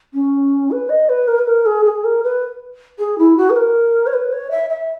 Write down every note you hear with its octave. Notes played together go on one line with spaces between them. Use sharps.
C#4
B4
D#5
B4
A#4
B4
A#4
G#4
G#4
A#4
B4
G#4
E4
F#4
B4
A#4
C#5
B4
C#5
E5
E5